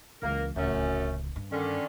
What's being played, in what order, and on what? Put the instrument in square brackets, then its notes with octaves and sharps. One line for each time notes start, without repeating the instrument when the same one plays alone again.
[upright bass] C#2 E3 [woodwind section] A#3 A#4
[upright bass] D1 C#2 [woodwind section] F#2 A3 C#4
[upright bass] G2
[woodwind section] D3 D#3 C#4